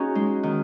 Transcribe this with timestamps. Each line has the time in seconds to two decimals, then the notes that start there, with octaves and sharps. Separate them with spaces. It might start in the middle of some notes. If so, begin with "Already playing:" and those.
Already playing: C#4 D#4 F#4 G#4
0.15 G#3
0.43 D#3